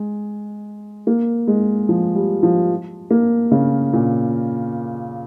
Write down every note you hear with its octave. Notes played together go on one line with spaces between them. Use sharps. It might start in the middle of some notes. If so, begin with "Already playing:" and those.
Already playing: G#3
A#3
G#3
F3
G3
F3
A#3
C#3
A#2